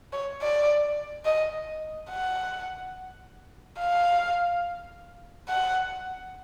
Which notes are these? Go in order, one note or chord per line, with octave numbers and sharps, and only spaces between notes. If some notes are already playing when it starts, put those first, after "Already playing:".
C#5
D5
D#5
F#5
F5
F#5